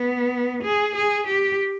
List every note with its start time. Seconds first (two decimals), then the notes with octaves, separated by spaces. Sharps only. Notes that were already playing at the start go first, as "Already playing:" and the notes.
Already playing: B3
0.63 G#4
0.95 G#4
1.27 G4